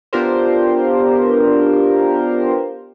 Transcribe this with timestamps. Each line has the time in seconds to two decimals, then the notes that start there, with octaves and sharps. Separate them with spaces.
0.13 B3 D4 F4 G4 A#4 C5